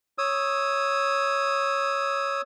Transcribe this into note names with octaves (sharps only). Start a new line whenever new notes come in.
C#5 D#6 E6